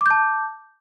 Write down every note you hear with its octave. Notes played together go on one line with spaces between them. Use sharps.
A5 D6 G6